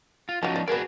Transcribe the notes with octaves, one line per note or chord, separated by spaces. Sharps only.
F4
F3 C#4 D#4 F#4 A5
D5
F#4 G#4 A#4 B4 D5